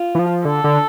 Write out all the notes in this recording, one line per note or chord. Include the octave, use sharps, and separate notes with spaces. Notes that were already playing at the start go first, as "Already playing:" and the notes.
Already playing: F4
E3
F3
D3 A4
D3